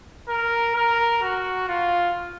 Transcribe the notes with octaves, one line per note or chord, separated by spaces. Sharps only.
A#4
A#4
F#4
F4